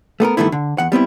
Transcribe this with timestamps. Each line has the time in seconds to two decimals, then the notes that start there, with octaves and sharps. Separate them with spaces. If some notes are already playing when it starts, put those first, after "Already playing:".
0.20 A3 B3 A4 A#4
0.37 G2 D#3 E3 A3 B3 E4
0.52 D3
0.78 E2 F#5
0.92 G3 B3 C4 E4